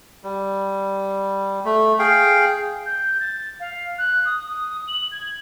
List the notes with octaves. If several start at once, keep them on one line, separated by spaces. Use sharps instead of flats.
G3
A3
G#4 F5 G5
G6
A6
F5
F#6
D#6
D#6
F#7
G#6